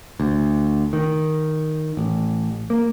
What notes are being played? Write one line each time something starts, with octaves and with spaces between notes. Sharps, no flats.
D2
D#3
A1
A#3